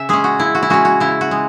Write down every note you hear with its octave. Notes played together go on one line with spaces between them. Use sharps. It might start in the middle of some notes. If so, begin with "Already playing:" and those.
Already playing: C#3 E5
G#3 C#4 G#4
F#4
C#3 E4
F#4
E4
G#3 C#4 F#4
F#4
C#3 E4
F#4
G#3